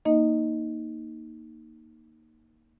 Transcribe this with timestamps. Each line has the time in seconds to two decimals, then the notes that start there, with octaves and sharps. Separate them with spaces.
0.05 A#3 D#4 D#5